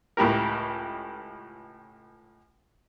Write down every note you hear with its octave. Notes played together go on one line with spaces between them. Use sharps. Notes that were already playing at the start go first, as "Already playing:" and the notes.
C#2 A2 G4 A#4